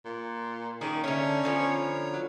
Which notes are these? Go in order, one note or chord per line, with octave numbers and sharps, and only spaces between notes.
A#2
D#3 A#3 C#4 G#4
D3 A3 C#4 C#5 A#5
D3 F3 B3
F#3